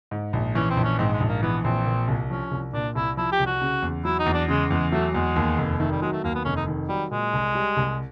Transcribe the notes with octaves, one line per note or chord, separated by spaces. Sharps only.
G#2
A#1
E3 C#4
C4
A#1
C#4
G#2 C4
G#3
A#1
A#3
E3 B3
A#1 C4
A#2
C2
F3 C#4
C2
A#2 D4
C2 E4
F3 E4
G4
C2
F#4
C#3
E2
F#3 E4
D#4
E2
D4
C#3 G#3
E2 G#3
F#3 A3
E2 G#3
D#2
F1
D#3 A3
G3
F#3 G#3
A3
D#2 A#3
B3
F1 C#4
D#4
D#3
F#3 G3
A#2 G#3
C2
G3
C2